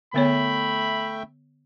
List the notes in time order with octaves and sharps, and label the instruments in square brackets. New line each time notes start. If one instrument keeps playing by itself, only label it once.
[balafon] D3 B3 C#5 [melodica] A3 E5 G5 [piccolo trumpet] B5